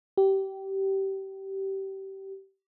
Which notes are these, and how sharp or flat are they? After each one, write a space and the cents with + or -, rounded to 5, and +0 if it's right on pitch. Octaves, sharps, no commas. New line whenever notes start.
G4 -20